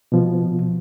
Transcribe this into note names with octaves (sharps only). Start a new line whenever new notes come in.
B2 F3